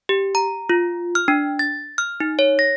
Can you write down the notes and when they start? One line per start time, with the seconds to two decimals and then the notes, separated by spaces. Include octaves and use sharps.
0.09 G4
0.35 A#5
0.69 F4
1.15 F6
1.28 D4
1.59 A6
1.98 F6
2.20 D#4
2.39 C#5
2.59 A#6